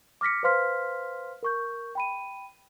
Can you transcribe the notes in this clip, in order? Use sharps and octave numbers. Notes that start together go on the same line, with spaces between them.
D6 F6 A#6 B6 C#7
B4 C5 F5 C6 F6 B6
A#4 C#6 G6
G5 B5 D#7